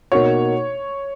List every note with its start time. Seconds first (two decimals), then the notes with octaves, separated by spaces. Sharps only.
0.12 B2 A#3 D#4 F#4 C#5